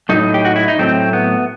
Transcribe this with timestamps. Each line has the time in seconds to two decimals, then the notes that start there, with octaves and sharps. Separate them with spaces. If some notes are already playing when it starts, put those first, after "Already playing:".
0.09 A2 F#3 A3 D#4
0.34 G4
0.45 F#4
0.56 E4
0.68 D#4
0.78 A2 F#3 A3 C4
1.13 B3